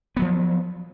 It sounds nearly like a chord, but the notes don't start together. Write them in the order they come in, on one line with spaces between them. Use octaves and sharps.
B3 F#3 F3